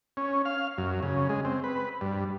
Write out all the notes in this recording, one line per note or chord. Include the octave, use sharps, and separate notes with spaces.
C#4
F5
F#2
C#3
G#3
C4
B4
G2